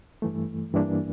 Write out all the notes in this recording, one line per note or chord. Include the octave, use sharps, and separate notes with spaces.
G2 E3 A3
G2 E3 A#3 D4